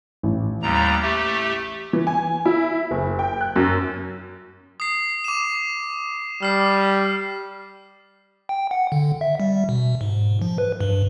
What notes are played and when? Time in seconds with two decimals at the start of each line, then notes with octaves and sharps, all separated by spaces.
0.23 A1
0.62 D#2 G3 A#5
1.02 A3 G4
1.93 E3
2.07 G#5
2.46 E4
2.91 F#1
3.19 G5
3.41 F#6
3.56 F#2
4.80 D#6 C7
5.24 D6 E7
6.43 G3 F6 C7
8.49 G5
8.71 F#5
8.92 D3
9.21 E5
9.40 G3
9.69 B2
10.01 G#2
10.42 F3
10.58 B4
10.81 G2